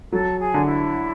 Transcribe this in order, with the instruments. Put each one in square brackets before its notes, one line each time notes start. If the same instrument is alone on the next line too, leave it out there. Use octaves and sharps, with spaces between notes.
[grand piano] F#3 [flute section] A4
[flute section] G#4
[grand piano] D3
[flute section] E4